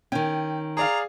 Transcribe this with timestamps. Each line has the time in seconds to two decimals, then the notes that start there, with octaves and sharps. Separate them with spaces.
0.12 D#3 C#4 G5
0.77 G#4 D5 F5 A#5